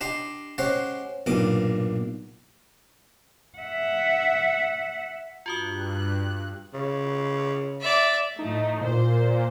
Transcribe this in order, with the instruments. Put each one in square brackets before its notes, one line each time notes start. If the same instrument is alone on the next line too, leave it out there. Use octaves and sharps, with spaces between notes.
[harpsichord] D4 G4 D#5 A#5 C6
G#3 C#4 G4 C5 F#5
B1 G2 A#2 D6 D#6
[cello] E5 F#5
[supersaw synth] G2 F#6 [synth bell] F4 F#4 D#6
[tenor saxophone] C#3
[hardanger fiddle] D5 E5
[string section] A2 F3 A3 [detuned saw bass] D#4
[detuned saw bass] A#2 [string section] C5